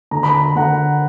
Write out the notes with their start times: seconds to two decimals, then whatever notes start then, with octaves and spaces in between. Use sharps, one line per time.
0.11 D3 A#5
0.23 B5
0.34 A#5
0.46 B5
0.56 D3 F#5 A#5